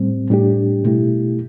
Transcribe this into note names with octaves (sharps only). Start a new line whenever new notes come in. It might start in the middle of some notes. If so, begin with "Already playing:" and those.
Already playing: A2 G3 C4
A2 G3 D4 G4
B2 A3 E4 G4